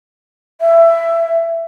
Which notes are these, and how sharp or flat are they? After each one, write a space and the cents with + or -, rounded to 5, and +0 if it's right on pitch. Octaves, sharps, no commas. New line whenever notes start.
E5 +20